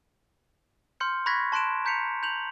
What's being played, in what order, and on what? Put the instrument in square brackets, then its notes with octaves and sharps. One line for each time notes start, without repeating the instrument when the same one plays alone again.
[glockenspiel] C6 F6 G6 C#7
B5 C#6 F#6 G#6 A#6 B6
A5 C6 F#6 D7 E7
A#5 G6 B6 C#7 F7
G6 F7 F#7